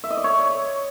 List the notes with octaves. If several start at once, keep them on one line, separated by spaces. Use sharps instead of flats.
E5
D#5
D5
C#5